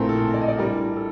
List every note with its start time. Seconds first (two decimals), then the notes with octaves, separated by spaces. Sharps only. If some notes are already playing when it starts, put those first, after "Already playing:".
Already playing: A#1 A2 A3 C4 A#4 C5
0.09 A4
0.34 D5
0.41 D#5
0.48 D5
0.59 A2 G3 D4 A#4
0.96 A4